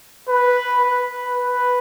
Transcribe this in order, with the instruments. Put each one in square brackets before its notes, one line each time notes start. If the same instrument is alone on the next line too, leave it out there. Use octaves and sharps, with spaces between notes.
[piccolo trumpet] B4
B4
B4